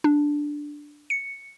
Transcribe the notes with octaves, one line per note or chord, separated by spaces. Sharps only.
D4
C#7